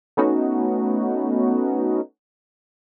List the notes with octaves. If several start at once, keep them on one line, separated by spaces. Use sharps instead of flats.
A3 B3 C#4 D#4 F#4